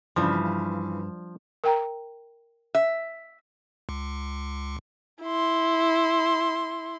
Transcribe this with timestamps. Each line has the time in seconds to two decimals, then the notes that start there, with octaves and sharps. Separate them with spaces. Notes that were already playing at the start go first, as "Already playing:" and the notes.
0.16 G2 C#3 E3 F3
1.64 A#4 G5 A#5
2.75 E5
3.89 C#2
5.23 E4 C6